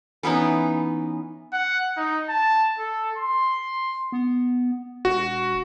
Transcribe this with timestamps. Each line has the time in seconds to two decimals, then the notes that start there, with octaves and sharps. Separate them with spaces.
0.23 E3 B3 C#4 D#4
1.53 F#5
1.97 D#4
2.29 A5
2.79 A4
3.18 C6
4.12 B3
5.05 E1 F#4